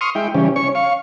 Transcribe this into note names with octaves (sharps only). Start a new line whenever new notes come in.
C6 C#6 D#6 F6
G#3 E4 G5
C#3 E3 G3 C#4
C#4 C#5 C#6
F5 C#6